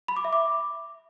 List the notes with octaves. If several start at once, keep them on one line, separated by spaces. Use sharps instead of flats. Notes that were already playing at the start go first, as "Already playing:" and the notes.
B5
D6
E5
D6